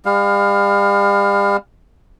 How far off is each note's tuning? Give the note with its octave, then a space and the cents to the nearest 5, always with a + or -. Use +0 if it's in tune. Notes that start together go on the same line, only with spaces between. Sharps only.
G3 +40 F5 +20